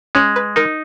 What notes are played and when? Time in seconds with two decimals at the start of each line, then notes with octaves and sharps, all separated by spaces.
0.15 G#3 C#4
0.36 B4
0.56 D#4 A#4